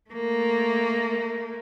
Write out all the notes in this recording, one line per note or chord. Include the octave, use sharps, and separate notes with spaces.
A3 A#3